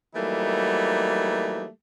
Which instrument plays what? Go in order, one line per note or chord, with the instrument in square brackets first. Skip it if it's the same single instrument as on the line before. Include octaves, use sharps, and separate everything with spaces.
[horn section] E3 F#3 G3 A3 A#3 D#4